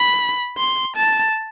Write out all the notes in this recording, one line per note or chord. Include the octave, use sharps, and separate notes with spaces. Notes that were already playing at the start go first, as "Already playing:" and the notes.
Already playing: B5
C6
A5